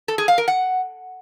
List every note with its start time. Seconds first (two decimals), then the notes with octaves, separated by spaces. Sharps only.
0.08 A4
0.18 G#4
0.28 F5
0.38 A#4
0.48 F#5